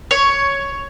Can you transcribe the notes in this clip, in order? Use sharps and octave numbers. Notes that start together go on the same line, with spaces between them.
C#5